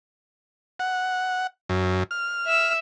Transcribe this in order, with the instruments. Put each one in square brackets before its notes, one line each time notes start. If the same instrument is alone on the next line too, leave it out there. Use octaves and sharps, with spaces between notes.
[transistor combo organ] F#5
F#2
F6
[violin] E5 E6